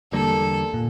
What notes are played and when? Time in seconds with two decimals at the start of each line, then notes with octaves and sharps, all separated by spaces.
0.12 E2 D3 G3 A#3 A4
0.74 A#2